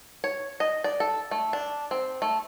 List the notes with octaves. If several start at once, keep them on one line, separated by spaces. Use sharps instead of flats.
C#5
D#5
D5
A4
A3
D4
C4
A3